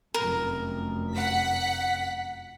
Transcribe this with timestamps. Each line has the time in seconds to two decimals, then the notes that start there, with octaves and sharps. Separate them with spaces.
0.14 F1 F#2 A#4
1.14 F#5 B6